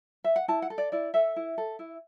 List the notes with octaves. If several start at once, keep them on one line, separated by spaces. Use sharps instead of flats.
E5
F#5
E4 A5
F#5
A4
D5
E4 D5
A4 E5
E4
A4
E4